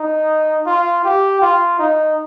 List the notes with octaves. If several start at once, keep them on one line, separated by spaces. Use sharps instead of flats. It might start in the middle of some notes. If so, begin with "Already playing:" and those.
Already playing: D#4
F4
G4
F4
D#4